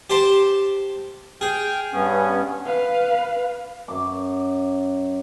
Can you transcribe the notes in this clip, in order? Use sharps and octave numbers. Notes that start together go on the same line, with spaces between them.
G4 C5 A5
G#4 G5 F6
G2 B3 C#4
B4 F5
F#2 D6